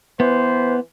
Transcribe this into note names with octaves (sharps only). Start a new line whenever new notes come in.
E3 B3 C5